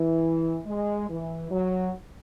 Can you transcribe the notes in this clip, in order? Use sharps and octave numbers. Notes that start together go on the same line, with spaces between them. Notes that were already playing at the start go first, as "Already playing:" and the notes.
Already playing: E3
G#3
E3
F#3